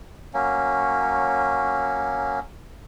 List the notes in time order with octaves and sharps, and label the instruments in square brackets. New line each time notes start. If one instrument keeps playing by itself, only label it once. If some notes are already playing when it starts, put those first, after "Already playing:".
[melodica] F#3 A#3 C#4